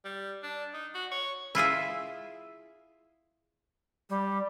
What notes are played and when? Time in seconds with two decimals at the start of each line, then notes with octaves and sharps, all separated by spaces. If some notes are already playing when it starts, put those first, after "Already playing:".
0.05 G3
0.43 D4
0.74 D#4
0.94 F#4
1.12 C#5
1.55 E4 F4 G#4 E5
4.10 G3